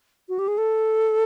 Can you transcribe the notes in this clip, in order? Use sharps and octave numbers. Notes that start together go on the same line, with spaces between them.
F#4
G4
G#4
A4